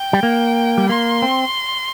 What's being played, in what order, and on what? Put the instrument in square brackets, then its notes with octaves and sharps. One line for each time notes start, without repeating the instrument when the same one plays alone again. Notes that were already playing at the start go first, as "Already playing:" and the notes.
Already playing: [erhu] G5
[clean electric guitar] G3
A#3
G3
[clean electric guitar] A#3 [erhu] C6
[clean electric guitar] C4